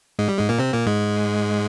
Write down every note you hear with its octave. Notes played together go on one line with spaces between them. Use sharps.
G#2 G#3
G3
G#2 G#3
A#2 A#3
C3 C4
A#2 A#3
G#2 G#3